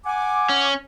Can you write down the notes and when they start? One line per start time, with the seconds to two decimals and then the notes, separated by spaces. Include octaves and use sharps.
0.06 F#5 G#5 D6
0.49 C#4